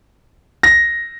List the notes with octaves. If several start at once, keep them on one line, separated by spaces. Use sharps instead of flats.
A#6